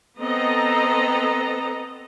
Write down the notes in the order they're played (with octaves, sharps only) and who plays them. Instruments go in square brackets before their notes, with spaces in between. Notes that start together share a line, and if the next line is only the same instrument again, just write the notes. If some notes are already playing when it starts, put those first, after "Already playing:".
[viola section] B3 C4 A4 D#5 A#5